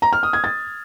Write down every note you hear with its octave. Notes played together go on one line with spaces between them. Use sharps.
A#5
F6
D#6
G#6
A6